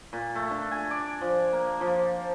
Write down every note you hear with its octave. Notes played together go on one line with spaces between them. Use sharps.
A#2
A3
D4
G#5
D5
F3
A#3
F3